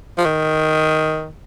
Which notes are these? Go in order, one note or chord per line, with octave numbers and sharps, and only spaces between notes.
F3
D#3